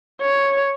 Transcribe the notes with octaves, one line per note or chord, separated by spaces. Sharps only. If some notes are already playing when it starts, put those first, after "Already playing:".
C#5